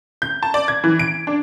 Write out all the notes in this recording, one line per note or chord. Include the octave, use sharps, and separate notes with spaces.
G6
A5
D5
G#6
E3
D7
D4